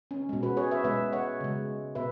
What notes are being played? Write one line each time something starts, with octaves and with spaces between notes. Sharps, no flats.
C#4
B2 G#3
F#4 B4
G#4 C#5
B4 E5
B2 G#3 B4 E5
C#5 F#5
C#3 G#3
B2 B4 E5